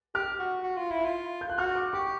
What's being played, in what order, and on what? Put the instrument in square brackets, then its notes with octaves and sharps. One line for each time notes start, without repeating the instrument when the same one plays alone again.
[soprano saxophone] G4 [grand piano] F6
[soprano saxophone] F#4
F#4
F4
E4
F4
[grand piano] G6
F#6
[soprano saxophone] F#4 [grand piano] F6
[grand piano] D6
[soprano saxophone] G4 [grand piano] C#6